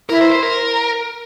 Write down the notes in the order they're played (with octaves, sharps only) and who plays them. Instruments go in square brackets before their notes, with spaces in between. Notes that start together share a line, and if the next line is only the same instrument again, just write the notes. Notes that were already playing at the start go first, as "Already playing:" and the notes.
[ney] E4 [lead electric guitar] A#4
[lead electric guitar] C5
C5
A#4